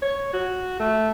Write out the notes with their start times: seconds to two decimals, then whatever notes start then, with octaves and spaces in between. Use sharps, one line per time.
0.02 C#5
0.33 F#4
0.80 A3